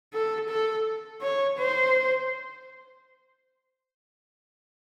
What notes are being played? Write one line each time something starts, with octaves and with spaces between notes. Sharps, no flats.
A4
A4
C#5
C5